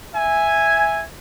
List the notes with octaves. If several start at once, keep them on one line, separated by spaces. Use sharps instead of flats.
E5 G#5